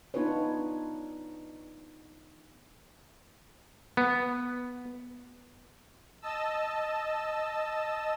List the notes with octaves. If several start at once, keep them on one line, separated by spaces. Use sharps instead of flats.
B3 D4 D#4 F4 B4 C#5
B3
D#5 A5 E6